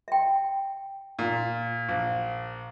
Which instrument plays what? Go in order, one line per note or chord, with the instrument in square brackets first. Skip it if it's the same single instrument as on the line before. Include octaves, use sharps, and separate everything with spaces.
[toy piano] E5 G5
[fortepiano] A#2
A#1